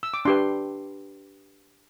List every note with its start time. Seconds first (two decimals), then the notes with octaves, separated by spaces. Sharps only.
0.03 E6
0.14 D6
0.25 D4 G4 B4 C6